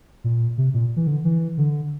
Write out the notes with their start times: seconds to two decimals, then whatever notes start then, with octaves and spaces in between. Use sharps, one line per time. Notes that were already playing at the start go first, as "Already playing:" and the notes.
0.24 A#2
0.58 C3
0.74 A#2
0.96 E3
1.07 D3
1.24 E3
1.58 D3